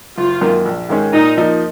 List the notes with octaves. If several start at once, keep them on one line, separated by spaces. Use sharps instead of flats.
F#1 F4
F#2 D#3 A#3
A#1
G#2 D#3 G#3 C#4
A#2 D#4
F3 A#3 D#4